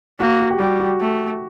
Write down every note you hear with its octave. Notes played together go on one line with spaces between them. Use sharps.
A#3 F#4
F#4
G4
G3 F#4
F#4
A3